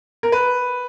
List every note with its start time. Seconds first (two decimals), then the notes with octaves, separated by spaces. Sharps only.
0.23 A#4
0.32 B4